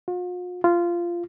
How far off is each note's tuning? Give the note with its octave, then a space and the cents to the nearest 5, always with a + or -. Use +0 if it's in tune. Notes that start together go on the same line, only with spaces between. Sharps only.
F4 +45
F4 -15